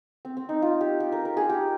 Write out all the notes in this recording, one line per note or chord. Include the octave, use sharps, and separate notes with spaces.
C4
C4
D#4
F4
G4
G4
A#4
A#4
G#4
G4